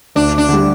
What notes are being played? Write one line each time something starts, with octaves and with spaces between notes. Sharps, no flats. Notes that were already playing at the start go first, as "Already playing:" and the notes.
D2 D4
D4
D3 G3